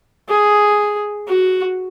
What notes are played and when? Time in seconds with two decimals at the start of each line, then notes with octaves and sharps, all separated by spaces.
0.29 G#4
1.28 F#4